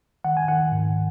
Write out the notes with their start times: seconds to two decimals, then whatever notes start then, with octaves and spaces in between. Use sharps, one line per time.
0.24 D#3 F#5
0.37 G#5
0.48 D#3 F#5
0.71 G#2